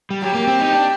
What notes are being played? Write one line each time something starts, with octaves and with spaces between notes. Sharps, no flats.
G3
F#3 G4
A#3
C4
D#4
D4